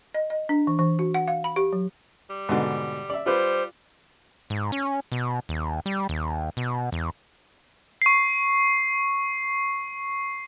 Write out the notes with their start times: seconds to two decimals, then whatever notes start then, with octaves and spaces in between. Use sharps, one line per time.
0.15 D#5
0.30 D#5
0.49 D4
0.67 E3
0.79 E3
0.99 F#4
1.14 F#5
1.28 F5
1.44 B5
1.56 G4
1.73 F#3
2.30 G3
2.49 G#2 B2 D3
3.10 D5 E5
3.26 G3 F4 B4 C5
4.50 G#2
4.72 C#4
5.12 B2
5.49 D#2
5.86 G3
6.09 D#2
6.57 B2
6.92 E2
8.02 C#6 C7